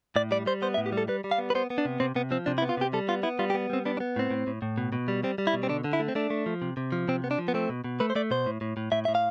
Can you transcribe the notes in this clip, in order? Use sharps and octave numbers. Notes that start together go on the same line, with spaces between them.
A2 D5
G3 D5
G3 C5
B3 C5
E5
A2
G4
G3
A4
G3 B4
G3
F5
B3
B4
B3 C5
B3
D4
C3
C3 C4
C3 B3
F3 C4
C3 D4
E4
B3
F4
C3 G4
G3 A4
B3 F4
B3 E4
G3 F4
G4
B3
G3 C4
B3 D4
D4
B3
A2 C4
A2
A2
A2
B2
B2
G3
G3 C4
G3
E4
B2
C4
D3 D4
D3
E4
A3
C4
A3 D4
A3
F3
C3
C3
F3
C3 C4
B3
D4
F3
B3
A3 C4
B2
B2
A3 B4
C5
A3 D5
B2 C5
A2
A2
A2
A2 E5
A2 E5
F5